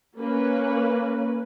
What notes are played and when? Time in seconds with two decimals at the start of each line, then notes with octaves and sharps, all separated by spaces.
0.17 A#3 C#4 B4